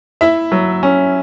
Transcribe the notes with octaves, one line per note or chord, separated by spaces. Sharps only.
E4 E5
F#3
C#4